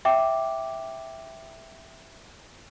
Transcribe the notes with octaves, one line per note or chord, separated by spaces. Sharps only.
E5 G5 D6